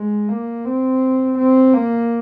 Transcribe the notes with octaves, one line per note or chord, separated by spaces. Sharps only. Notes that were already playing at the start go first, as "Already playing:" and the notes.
Already playing: G#3
A#3
C4
C4
A#3